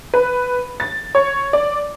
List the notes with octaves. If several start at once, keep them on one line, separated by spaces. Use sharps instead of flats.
B4
A6
C#5
D5